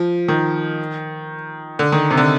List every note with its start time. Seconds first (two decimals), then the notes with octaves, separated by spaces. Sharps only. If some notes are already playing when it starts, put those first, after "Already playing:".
Already playing: F3
0.28 D#3
1.79 D3
1.92 D#3
2.10 C3
2.17 D3